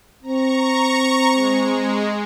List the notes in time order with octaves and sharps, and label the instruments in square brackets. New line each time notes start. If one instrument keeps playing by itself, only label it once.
[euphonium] C4 [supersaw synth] A#5 C#6
[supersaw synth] G#3